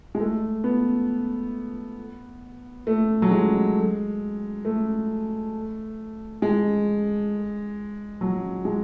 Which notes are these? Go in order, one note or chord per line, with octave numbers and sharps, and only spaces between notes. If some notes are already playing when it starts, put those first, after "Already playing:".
G#3
A3
B3
A3
F#3
G#3
A3
G#3
F#3
G#3